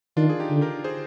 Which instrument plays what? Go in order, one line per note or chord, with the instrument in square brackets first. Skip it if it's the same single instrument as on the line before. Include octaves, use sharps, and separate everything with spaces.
[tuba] D#3 [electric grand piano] D4 F4
[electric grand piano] G#4
D#4 G4
[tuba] D3
[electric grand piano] G4 A#4
G#4 C5